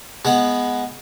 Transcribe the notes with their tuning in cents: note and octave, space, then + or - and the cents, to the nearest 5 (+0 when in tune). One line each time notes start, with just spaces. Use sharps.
G#3 +10 B3 +0 F#5 +0